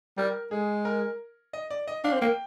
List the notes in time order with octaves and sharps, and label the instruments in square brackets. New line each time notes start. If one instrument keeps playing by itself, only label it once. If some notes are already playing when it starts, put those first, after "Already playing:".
[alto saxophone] G3 [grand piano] A#4
[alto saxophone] G#3 [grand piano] G#4
[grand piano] A#4
D#5
D5
D#5
[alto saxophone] D4 [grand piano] F5
[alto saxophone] C4
[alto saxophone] A#3 [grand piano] G5